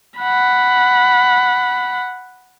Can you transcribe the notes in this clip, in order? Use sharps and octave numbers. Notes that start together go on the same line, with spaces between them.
F#5 B5